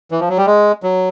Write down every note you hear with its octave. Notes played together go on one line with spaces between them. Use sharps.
E3
F3
F#3
G3
G#3
F#3